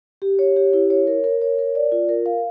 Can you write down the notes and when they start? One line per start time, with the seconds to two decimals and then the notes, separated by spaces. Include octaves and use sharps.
0.22 G4
0.39 C#5
0.56 G4
0.73 E4
0.90 C#5
1.07 A#4
1.24 A#4
1.42 C#5
1.58 A#4
1.75 D5
1.92 F4
2.09 A#4
2.26 F5